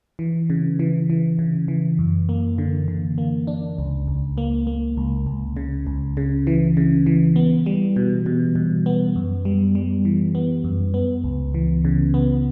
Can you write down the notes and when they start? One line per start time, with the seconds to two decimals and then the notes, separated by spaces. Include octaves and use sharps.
0.19 E3
0.50 C#3
0.79 E3
1.10 E3
1.39 C#3
1.68 E3
1.99 F#2
2.29 A#3
2.58 D3
2.88 D3
3.18 A#3
3.47 D4
3.78 C#2
4.08 C#2
4.38 A#3
4.67 A#3
4.97 C#2
5.27 C#2
5.57 C#3
5.87 C#2
6.17 C#3
6.47 E3
6.77 C#3
7.06 E3
7.36 B3
7.66 G3
7.96 B2
8.26 B2
8.56 B2
8.86 B3
9.16 F#2
9.45 G3
9.75 G3
10.05 E3
10.35 B3
10.64 F#2
10.94 B3
11.24 C#2
11.54 E3
11.85 C#3
12.14 B3